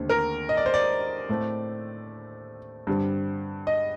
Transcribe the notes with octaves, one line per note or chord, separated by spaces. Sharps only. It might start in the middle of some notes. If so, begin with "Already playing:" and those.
Already playing: D#2 D3 A3 C4
A#4
D#5
D5
C5
D5
A2 A3 C4
G2 D3 G3 C4
D#5